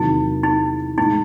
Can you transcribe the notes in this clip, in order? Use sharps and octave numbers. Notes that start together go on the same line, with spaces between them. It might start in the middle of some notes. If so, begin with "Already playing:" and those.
Already playing: E2 C3 D#3 F#3 A#3 D#4
D#4
A2 E3 G#3 D#4